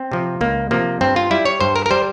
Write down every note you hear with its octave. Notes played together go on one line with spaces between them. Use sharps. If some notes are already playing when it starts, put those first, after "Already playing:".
Already playing: C4
C3 F3
C#2 A#3
C3 F3 A#3
G2 C4
F4
G3 E4
C#5
G2 C5
A#4
A#4
G3 C5